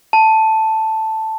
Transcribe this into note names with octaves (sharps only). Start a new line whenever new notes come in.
A5